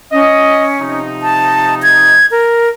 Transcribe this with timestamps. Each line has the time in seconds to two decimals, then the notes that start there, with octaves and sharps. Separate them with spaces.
0.12 C#4 D#5
0.81 C3 F3 D#4
1.22 A5
1.83 G#6
2.31 A#4